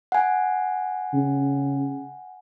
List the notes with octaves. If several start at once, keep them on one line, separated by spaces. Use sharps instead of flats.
F#5 G#5
C#3